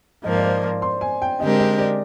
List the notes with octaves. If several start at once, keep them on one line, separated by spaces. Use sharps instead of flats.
G#2 F3 A#3 D#5
D5
C5
C6
G#5
G5
D3 G#3 C4 G4 A#4 D#5
D#5
D5